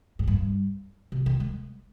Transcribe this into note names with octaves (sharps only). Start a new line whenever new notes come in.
G#2
G2
C3
D#3
G#3